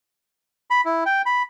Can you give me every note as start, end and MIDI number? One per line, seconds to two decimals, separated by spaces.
0.70 0.81 83
0.85 1.04 64
1.06 1.22 79
1.26 1.43 83